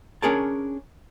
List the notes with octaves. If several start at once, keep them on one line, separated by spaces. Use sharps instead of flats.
C#4 D4 G#4 A#4 C#5 A5